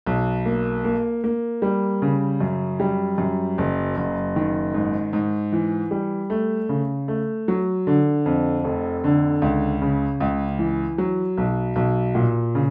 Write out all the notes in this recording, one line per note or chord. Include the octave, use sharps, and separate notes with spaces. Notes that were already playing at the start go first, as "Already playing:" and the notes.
B1
A#3
A#3
A#3
G3
C#3
F#2
G3
F#2
F#1
F#1
D#3
G#2
G#2
E3
G3
A3
C#3
A3
F#3
D3
F2
F1
D3
C#2
C#3
C#2
E3
F#3
B1
B1
A#2
C#3